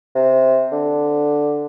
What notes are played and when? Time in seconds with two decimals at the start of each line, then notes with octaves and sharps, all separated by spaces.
0.15 C3
0.72 D3